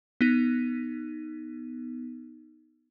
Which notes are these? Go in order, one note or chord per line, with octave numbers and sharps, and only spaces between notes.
B3 D#4